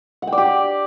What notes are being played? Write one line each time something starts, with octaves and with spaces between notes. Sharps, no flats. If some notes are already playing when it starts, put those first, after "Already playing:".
F#5
G5
D5
G4